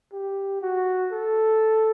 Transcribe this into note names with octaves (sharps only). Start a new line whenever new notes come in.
G4
F#4
A4